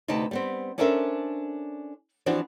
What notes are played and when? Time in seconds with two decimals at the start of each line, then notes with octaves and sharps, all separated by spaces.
0.08 D2 C3 D#4 G4 B4 A5
0.31 G3 B3 C4
0.78 C#4 D4 A4 A#4 C5 E5
2.26 E3 F3 C4 D4 F#4